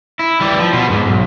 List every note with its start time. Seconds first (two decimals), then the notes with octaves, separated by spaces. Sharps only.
0.19 E4
0.41 E3 G3
0.60 F3
0.73 B2
0.87 B1 G#2
1.07 B1